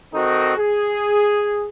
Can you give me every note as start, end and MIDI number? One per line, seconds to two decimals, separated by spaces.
0.13 0.55 51
0.13 0.55 60
0.13 0.55 63
0.13 0.55 66
0.13 0.55 69
0.57 1.69 68